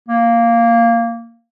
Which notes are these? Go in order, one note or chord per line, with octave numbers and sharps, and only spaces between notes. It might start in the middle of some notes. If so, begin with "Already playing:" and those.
A#3